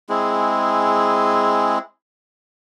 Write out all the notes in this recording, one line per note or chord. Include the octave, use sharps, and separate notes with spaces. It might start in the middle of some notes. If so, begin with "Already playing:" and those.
G#3 C4 E4 G#4